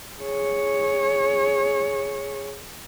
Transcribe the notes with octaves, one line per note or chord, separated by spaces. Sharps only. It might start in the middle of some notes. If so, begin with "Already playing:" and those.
G#4 C#5